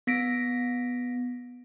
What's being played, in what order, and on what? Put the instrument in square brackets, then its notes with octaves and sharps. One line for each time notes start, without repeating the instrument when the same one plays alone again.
[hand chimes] B3 A#6 B6 D7